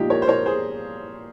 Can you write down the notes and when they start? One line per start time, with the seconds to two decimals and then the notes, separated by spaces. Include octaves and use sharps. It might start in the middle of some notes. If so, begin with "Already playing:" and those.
Already playing: A#2 F3 G#3 D#4 F4 G4
0.10 A#4 C#5
0.22 C5
0.28 A#4 C#5
0.46 G#4 C5